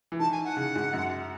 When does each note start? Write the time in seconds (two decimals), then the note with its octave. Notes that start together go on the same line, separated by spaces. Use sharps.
0.12 E3
0.19 D#3 A5
0.32 G#5
0.44 F#5
0.57 C#3
0.76 G#2
0.93 F#2